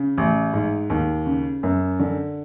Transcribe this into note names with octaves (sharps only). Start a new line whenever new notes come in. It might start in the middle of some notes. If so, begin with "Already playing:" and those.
Already playing: C#3
A1
G#2
D#2
C#3
F#2
D3